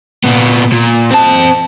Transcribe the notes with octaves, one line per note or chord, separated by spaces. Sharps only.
A#2 B3
A#2
C4 A5